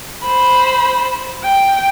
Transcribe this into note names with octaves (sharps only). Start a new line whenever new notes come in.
C5 B5
G5